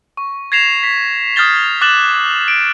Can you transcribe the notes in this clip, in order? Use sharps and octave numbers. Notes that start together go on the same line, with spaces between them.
C#6
G#6 A#6 C7 E7 F7
B6
D#6 F6 G6 A6 G7
D6 F#6 A6 E7 F#7
D7